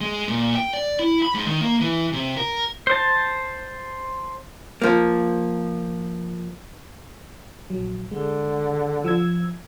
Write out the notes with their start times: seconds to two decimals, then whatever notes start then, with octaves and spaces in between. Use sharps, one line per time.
0.01 G#3
0.28 A#2
0.55 G5
0.74 D5
0.99 E4
1.22 B5
1.34 G#2
1.47 D#3
1.61 A#3
1.80 E3
2.13 C3
2.37 A#4
2.87 C5 A5
4.82 F3 A#3
7.70 A#1 F#3
8.11 D3 G#3
9.04 F3 E6 G#6